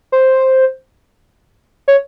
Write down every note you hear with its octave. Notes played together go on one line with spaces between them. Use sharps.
C5
C#5